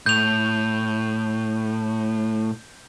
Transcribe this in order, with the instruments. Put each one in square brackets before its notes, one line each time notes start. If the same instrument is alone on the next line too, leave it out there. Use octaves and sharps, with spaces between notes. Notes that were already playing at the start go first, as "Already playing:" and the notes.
[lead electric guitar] A2 [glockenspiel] G6 F7